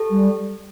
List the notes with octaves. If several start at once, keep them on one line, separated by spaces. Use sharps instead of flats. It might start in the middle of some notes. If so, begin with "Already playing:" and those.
Already playing: G4 A4
G3